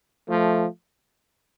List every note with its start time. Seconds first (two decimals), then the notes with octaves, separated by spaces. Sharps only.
0.29 F3 A3